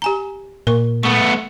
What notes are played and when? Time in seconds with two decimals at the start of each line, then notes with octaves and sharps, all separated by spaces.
0.02 G4 G#5 A#5
0.67 A#2 A#4 C#6
1.03 A3 B3 C#6